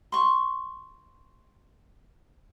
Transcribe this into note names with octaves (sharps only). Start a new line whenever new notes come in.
C6 C#6